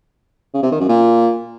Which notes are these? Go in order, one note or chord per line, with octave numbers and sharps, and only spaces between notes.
C#3
C3
D#3
F#2
A#2